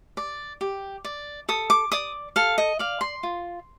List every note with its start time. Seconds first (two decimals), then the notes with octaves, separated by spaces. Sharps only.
0.17 D5
0.61 G4
1.04 D5
1.49 A4 D#6
1.70 D6
1.92 D5 D#6
2.36 A4 F5
2.58 D#5
2.79 D5 F5
3.01 C6
3.23 F4